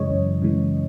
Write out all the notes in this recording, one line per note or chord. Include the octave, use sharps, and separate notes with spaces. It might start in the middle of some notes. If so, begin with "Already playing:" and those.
Already playing: F#2 C#3 E3 G#3 C#5 D#5
F#2
C#3 E3 G#3